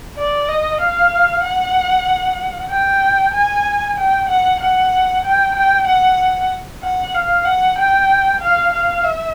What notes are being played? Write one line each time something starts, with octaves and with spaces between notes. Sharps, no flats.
D5
D#5
F5
F#5
G5
G#5
G5
F#5
F#5
G5
G5
F#5
F#5
F5
F#5
G5
F5
F5
E5